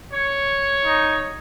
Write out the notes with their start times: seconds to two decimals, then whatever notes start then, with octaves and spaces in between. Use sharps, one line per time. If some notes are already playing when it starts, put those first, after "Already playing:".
0.13 C#5
0.85 D#4